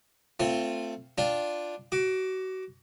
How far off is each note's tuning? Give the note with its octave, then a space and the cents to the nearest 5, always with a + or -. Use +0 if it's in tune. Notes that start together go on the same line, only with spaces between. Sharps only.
A3 +20 C4 +0 F4 +0
D4 +0 F4 +0 G5 +0
F#4 +25 D6 +0